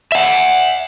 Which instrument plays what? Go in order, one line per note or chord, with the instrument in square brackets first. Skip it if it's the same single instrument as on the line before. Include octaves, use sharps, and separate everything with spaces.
[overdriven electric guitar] E5 F#5